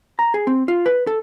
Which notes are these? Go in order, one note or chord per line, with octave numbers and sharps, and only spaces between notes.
A#5
G#4
C4
F4
B4
A4